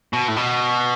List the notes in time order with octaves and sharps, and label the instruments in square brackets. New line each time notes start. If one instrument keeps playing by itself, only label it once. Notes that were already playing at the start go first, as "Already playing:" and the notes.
[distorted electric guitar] B2
A2
B2